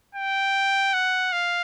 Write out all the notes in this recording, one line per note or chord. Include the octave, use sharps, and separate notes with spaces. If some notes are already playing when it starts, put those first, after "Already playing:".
G5
F#5
F5